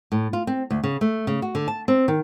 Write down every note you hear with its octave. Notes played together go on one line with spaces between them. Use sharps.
A2
F4
C4
D2
C#3
A3
C#3
F#4
D3
A5
C4
D#3